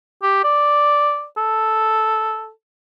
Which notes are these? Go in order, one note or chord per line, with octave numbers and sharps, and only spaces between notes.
G4
D5
A4